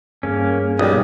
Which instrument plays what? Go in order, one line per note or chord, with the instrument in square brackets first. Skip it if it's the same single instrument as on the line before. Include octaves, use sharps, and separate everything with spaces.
[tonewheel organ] G2 G#4 [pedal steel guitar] A#3 C#4
[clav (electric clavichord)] B1 [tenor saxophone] G3 [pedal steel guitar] D#6